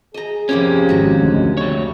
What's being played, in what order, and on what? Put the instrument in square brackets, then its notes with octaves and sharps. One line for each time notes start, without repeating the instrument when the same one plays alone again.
[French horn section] G#4 [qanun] D#5 A#5
[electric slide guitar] F2 C#4 [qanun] C3 G3 A#3
[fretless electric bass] G#1 [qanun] F#4 A#5
[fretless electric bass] D2 [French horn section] D#3 G#3
[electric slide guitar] G3 C#5 [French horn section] A3